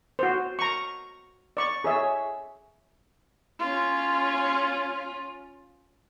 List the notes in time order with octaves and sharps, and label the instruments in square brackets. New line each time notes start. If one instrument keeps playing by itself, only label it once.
[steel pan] F#4 C5
A#5 C#6
D5 C#6
G#4 C#5 E5
[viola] C#4 F4